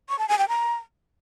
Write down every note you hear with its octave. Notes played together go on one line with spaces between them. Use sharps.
C#6
A5
G#5
G5
A#5